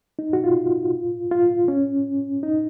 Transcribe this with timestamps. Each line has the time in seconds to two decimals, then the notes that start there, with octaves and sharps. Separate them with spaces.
0.19 D#4
0.33 F#4
0.44 F4
1.31 F4
1.68 C#4
2.43 D#4